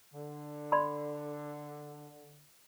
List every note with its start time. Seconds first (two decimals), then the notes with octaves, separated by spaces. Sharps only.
0.14 D3
0.72 D5 B5 C6